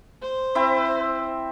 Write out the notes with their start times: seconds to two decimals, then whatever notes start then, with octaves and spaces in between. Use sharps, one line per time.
0.22 C5
0.55 C4 E4 E5